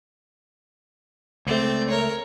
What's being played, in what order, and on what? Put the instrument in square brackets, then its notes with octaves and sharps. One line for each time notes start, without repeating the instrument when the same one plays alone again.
[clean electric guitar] C#2 A3 [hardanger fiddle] C4 D5
[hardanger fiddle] A#4 C#5